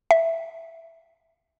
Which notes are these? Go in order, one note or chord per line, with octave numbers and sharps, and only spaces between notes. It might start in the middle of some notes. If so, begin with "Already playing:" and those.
E5